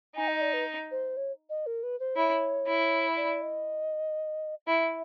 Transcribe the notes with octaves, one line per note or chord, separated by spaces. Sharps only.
D#4 G#5
D#5
D5
B4
C5
C#5
D#5
A#4
B4
C5
E4 C#5
E4
D5
D#5
E4 E5